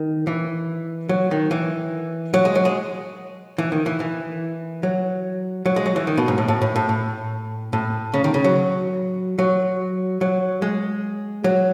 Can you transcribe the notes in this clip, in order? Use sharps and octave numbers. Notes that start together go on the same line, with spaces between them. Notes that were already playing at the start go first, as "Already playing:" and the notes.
Already playing: D#3
E3
F#3
D#3
E3
F#3
G#3
F#3
G#3
E3
D#3
E3
E3
F#3
F#3
G#3
F#3
E3
D#3
B2
G#2
A2
A2
A2
A2
A2
A2
C#3
D#3
C#3
F#3
F#3
F#3
G#3
F#3